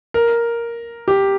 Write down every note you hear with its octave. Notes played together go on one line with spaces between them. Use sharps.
A#4
G4